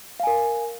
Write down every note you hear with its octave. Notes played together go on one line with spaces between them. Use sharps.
A#4 F5 G#5